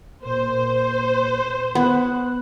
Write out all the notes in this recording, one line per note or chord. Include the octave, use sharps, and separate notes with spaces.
A#2 C5
B3 F#6